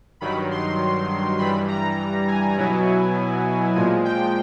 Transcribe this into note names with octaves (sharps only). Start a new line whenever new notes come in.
G2 D#3 F#3 B5
C6
G2 E3 G3 B5
A#5
G#5
B2 F#3 B3 E4
A#2 F3 G#3 G#5
G5